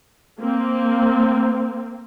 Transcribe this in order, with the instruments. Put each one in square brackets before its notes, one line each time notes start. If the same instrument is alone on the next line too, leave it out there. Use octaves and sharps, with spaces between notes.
[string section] A#3 C4